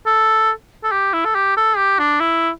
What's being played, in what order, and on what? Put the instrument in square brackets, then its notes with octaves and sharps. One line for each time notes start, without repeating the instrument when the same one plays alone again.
[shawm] A4
A4
G4
E4
A4
G4
A4
G4
D4
E4